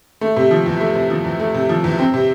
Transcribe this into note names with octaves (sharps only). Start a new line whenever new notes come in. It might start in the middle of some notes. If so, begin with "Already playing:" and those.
A3
C3
F3
E2
A3
C3
F3
E2
A3
C3
F3
E2
C4
C3